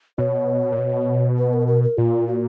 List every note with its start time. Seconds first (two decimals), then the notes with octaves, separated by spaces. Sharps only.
0.18 B2 C#5
0.72 A#2
0.78 B2
1.38 B4
1.53 A#4
1.67 A#4
1.83 A#4
1.97 A#2 F4
2.27 F#4